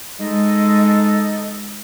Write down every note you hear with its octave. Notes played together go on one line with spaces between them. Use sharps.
G#3 D#4 A4 D#5